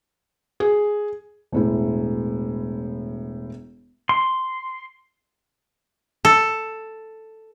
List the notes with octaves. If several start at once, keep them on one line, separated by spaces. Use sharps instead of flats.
G#4
E1 A2 E4
C6
A4